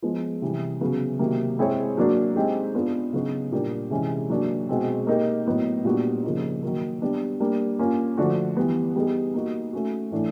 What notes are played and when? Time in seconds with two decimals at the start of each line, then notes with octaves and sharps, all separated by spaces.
0.02 F3 G#3 B3
0.42 C3 E3 G3
0.81 C#3 F#3 B3
1.19 C3 D#3 F#3 A#3
1.59 G#3 C4 E4 G#4 C#5
1.97 F#3 A#3 D4 F#4
2.36 G#3 C4 D#4 G4
2.74 B3 D4 F4 G#4 B4
3.13 C#3 F#3 B3 D#4 F#4
3.52 A#2 G3 A#3 D4 G4
3.91 C3 E3 G#3 C#4
4.30 F#3 A#3 D4
4.69 B2 G#3 C4
5.07 A#3 D#4 G4 A#4
5.46 A2 F#3 B3 D#4
5.85 A#2 G3 B3 D4 F#4
6.23 C#3 F3 A#3 D#4
6.63 D#3 F#3 A#3
7.02 G3 B3 D4
7.40 G3 A#3 D4
7.79 A#3 C#4 F4
8.18 D3 F3 A3 D4 F#4
8.57 E3 G3 B3
8.96 G3 B3 D#4 G#4
9.34 A#3 D#4 F#4
9.73 A3 C#4 F#4
10.12 A2 E3 A3 D4